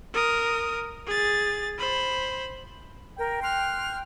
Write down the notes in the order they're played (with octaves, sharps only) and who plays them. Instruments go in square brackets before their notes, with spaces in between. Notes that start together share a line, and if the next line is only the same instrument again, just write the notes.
[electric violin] A#4 D#6
G#4 A6
C5 B5
[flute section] A#4 [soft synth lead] G5
[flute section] C6 F6 F#6